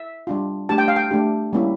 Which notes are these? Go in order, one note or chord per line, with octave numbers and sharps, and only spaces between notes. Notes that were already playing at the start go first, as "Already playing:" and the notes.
Already playing: E5
G3 D4 F4
A3 D4 G4 A5
G5
F5
G5
A3 D4 G4
G3 A#3 C#4 E4